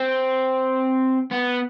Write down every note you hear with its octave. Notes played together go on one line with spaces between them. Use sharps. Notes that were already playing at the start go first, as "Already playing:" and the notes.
Already playing: C4
B3